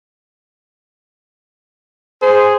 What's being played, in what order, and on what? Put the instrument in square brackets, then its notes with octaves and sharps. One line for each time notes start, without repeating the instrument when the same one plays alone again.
[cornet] G#4 [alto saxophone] C5